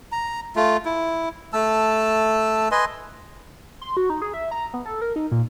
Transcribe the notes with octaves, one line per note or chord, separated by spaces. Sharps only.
A#5
A3 F4
E4
A3 A5 E6
B4 D#5 G#5 C6
C6
F#4
D#4
G#4
E5
A#5
B3
A4
A#4
D#4
A#2